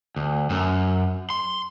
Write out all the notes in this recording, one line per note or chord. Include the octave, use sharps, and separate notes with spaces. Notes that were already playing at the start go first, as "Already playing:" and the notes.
D2
F#2
C6